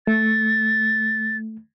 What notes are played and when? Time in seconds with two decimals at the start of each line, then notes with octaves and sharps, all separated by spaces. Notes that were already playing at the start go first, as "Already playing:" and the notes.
0.07 A3 A6